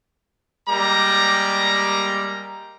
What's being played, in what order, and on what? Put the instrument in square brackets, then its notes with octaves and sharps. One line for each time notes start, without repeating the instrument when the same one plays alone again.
[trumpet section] G3 G#3 A#3 A#5 D6